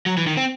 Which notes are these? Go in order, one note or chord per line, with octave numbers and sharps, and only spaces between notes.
F#3
E3
D#3
C4